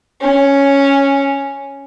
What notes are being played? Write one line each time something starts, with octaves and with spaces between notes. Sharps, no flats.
C#4